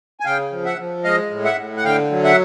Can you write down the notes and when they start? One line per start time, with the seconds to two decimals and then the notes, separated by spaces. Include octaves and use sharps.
0.20 G#5
0.25 C#3 F5 G5
0.52 F3
0.65 E5 F#5
0.78 F3
1.04 G#3 D#5 F5
1.31 A2
1.45 E5 F#5
1.57 A2
1.77 F#5
1.85 D3 F5 G5
2.11 F#3
2.24 E5 F#5